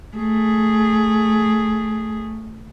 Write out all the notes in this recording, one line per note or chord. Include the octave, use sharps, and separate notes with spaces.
A3 G#4